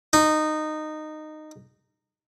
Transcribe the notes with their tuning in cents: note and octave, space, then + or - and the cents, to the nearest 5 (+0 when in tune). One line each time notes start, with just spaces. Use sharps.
D#4 -15